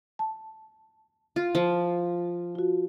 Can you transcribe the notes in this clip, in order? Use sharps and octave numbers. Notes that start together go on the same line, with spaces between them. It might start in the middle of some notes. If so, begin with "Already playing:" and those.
A5
F4
F3
F4 F#4